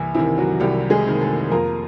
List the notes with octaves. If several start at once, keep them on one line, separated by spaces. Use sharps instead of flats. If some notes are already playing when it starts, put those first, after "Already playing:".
Already playing: C2 E3 E4
C3 D#3 E3 E4
F#3 F#4
C2 G3 G4
G#3 G#4
C3 D#3
A3 A4
F2 A#3 A#4